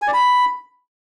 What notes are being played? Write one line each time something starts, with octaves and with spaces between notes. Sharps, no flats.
G#5
D5
B5